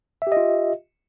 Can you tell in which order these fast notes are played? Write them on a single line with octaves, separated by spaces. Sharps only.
E5 G4 D#5 F4